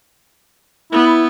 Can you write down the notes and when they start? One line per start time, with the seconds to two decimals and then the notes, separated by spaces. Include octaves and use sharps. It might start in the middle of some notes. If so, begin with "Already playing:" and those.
0.92 B3 E4